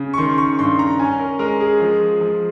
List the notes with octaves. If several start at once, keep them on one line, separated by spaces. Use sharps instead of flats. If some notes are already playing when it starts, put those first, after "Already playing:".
Already playing: C#3
C#6
D#3 C6
C#6
G2 C6
A#5
C#4 G#5
A#4
G#3 A#4
G#4
F3
F3